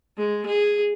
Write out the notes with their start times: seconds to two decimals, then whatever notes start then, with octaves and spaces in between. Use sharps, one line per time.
0.17 G#3
0.46 G#4